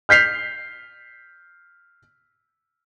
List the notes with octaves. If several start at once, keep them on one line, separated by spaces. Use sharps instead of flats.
F6 G6 B6 C7 F7